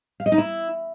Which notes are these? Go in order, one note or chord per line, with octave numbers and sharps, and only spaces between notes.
F5
D#5
D#4
E4